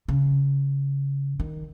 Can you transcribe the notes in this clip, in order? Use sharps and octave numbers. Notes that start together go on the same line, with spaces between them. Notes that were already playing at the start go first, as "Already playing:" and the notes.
C#3
D#3